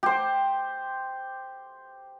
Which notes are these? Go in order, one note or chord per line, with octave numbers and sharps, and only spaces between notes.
G4 C5